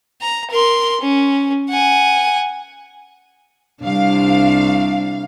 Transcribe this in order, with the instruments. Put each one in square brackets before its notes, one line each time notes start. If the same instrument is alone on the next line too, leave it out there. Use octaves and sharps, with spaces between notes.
[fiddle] A#5
A#4 C6
C#4
F#5 G#5
[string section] C2 F5 [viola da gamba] D4